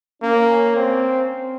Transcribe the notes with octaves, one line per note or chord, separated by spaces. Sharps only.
A#3 C#4
C4